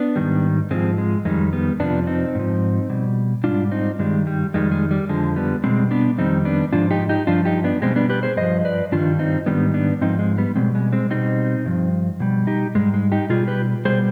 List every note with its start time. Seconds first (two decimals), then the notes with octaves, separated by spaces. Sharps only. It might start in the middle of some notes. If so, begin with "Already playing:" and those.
Already playing: B3 D4
0.16 G#2 D#3 G3
0.71 G#2 F3 G#3 C4
0.98 G#3
1.25 F2 D#3 G3 G#3
1.53 G3 B3
1.79 F2 C3 F3 B3 D4
2.07 C4 D#4
2.35 G#2 F3
2.90 B2 G3
3.44 G#2 G3 D4 F4
3.71 C4 D#4
3.99 G2 D#3 G3 G#3
4.27 G3
4.54 F2 D#3 G3 G#3
4.72 G#3
4.91 G3
5.09 F2 D3 F3 G#3
5.36 G3 B3
5.63 B2 G3 G#3 C4
5.91 B3 D4
6.18 F2 D#3 G3 C4 D#4
6.45 B3 D4
6.73 G#2 F3 D4 F4
6.91 D#4 G4
7.09 D#4 G4
7.27 G2 F3 D4 F4
7.45 D#4 G4
7.64 B3 D4
7.82 B2 G3 G#3 C4
7.96 B3 D4
8.09 G4 B4
8.23 G#4 C5
8.37 G2 F3 C5 D#5
8.65 B4 D5
8.92 G2 D#3 G3 D4 F4
9.19 C4 D#4
9.46 G#2 D#3 G3 B3 D4
9.74 B3 D4
10.01 G#2 F3 C4 D#4
10.19 G#3
10.38 G3 B3
10.56 B2 G3 G#3 C4
10.75 G#3
10.92 G#3 C4
11.10 B2 G3 C4 D#4
11.66 G2 F3
12.20 B2 G3
12.47 D#4 G4
12.75 G#2 G3 G#3
12.94 G#3
13.12 D#4 G4
13.29 B2 G3 F4 G#4
13.48 G4 B4
13.85 B2 G3 G#4 C5